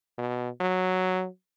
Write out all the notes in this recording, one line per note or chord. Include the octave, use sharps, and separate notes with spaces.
B2
F#3